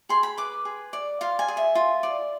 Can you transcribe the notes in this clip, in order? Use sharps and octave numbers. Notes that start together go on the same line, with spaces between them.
G#4 C6
B5
B4 D6
G#4
D5
F4 F5
G#5
G#4
E5
F4
D5